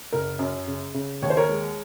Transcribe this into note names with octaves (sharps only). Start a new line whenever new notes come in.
F#1 A#4
F#2
C#3
C#3
D#2 C#5
C5
A#4 C#5
G#3